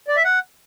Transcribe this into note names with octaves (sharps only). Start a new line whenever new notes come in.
D5
E5
F#5